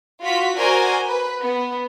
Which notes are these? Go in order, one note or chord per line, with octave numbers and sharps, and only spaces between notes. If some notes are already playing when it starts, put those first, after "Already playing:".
F4 F#4 B6
F#4 A#4 C5 D5 G#5
B4
B3